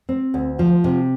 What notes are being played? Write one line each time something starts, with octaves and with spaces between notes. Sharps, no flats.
C4
D2
F3
C3